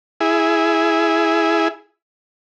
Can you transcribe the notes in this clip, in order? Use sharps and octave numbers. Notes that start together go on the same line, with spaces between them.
E4 G#4